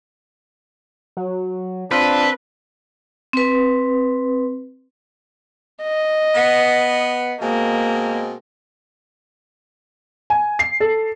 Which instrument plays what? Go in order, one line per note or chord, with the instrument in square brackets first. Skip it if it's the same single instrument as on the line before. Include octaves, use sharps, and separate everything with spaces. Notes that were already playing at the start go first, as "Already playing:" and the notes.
[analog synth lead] F#3
[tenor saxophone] C4 [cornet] D4 [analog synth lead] F4 [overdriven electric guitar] B4
[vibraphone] C4 B4
[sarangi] D#5
[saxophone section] B3
[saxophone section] B2 G#3 C4 [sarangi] A#3
[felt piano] G#5
C7
A4